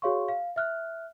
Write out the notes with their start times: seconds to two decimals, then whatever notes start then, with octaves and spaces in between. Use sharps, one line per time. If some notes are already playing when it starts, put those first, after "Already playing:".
0.02 F#4 G#4 C#5 F5 C6 C#6
0.28 F5
0.56 E5 F6 F#6